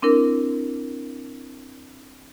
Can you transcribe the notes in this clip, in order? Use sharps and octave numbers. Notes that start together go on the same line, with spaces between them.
C4 D4 E4 A#4